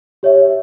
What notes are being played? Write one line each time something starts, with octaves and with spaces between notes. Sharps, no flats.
G4 C#5 E5